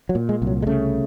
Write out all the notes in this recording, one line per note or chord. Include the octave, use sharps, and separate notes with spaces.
F#3
A#2
G#3
C2
F#3
G#3
C#3 A3